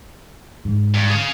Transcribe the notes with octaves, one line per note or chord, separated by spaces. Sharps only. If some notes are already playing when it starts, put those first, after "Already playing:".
G#2
G2
G#4 F5